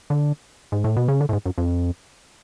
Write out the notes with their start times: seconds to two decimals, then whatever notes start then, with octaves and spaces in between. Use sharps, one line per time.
0.10 D3
0.72 G#2
0.84 A2
0.96 B2
1.08 C#3
1.21 D3
1.29 A2
1.33 G#2
1.46 F#2
1.58 F2